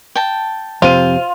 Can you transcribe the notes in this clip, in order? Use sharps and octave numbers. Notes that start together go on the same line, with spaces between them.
G5 A5
F2 C3 F4 C5 D#7